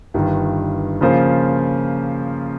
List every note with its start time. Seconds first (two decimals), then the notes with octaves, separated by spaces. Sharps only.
0.14 G1 G2 D#3
1.01 C#3 F3 A#3 F4 C5